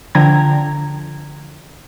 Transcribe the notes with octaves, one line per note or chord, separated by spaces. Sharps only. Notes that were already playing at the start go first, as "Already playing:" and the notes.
D3 F3 G5 A#5 G#6